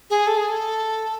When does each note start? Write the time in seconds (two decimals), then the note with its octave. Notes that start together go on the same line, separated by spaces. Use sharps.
0.10 G#4
0.27 A4
0.37 G#4
0.49 A4